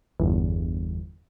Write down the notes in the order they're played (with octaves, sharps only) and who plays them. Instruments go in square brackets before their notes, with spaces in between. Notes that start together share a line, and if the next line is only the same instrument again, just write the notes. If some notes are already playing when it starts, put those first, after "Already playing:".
[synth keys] G1 E2